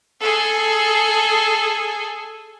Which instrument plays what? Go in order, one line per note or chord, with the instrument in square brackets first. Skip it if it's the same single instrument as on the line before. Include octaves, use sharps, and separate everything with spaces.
[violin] G#4 A4